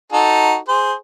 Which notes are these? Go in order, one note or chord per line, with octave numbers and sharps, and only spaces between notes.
D#4 F#4 A4
G#4 C5